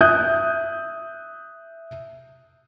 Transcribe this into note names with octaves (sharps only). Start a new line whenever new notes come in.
E5 D#6 F#6 G6